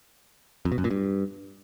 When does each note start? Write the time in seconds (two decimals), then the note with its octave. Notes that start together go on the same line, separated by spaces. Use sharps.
0.65 F2
0.72 B2
0.78 F#2
0.84 A#2
0.90 G2